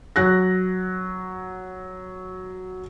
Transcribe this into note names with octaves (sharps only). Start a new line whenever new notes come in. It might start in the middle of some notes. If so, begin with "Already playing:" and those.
F#3 F#6 A#6